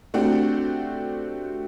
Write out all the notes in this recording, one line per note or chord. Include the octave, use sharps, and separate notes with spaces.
A3 C4 D4 F#4 G4